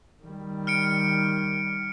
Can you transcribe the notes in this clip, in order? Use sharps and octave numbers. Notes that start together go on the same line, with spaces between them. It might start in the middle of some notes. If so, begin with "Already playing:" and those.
D#3 G3
F6 C#7 D7